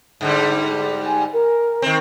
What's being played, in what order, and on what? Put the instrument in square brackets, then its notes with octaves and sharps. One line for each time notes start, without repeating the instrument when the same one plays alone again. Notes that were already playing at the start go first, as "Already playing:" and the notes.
[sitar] G#2 D3 G3
[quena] G#5
A#4
[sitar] D#3 C4